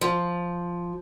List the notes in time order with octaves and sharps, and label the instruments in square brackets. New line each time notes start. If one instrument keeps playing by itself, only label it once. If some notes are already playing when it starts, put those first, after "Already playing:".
[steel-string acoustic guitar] F3